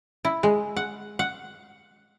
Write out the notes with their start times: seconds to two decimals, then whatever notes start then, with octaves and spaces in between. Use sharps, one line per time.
0.25 E4
0.43 G#3
0.76 F#5
1.19 F#5